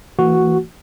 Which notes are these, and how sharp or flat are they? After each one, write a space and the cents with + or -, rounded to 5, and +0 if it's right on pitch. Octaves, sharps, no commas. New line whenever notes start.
E3 +0 A#3 -45 F#4 +0